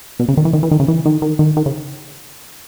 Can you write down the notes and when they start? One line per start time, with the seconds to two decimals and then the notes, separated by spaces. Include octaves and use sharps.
0.19 B2
0.28 C#3
0.37 D#3
0.45 E3
0.53 D#3
0.63 E3
0.71 D#3
0.80 C#3
0.88 E3
1.05 D#3
1.22 D#3
1.39 D#3
1.57 D#3
1.66 C#3